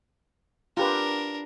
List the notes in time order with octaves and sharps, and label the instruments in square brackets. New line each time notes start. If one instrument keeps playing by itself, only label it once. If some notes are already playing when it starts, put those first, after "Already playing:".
[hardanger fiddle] D4 A#4 [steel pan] F4 G4 B4